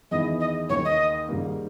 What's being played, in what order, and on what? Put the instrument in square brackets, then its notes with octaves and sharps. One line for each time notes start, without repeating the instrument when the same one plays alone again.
[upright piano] E2 D#3 G#3 B3 E4 [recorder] D#5
[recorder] D#5
[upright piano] D#2 D#3 A#3 D#4 [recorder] C#5
[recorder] D#5
[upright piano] G#2 D#3 G3 A#3